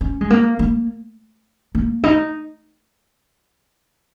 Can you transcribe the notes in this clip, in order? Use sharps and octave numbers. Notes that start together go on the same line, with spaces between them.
C#4
G#3
A#3
A#3
A#3
D#4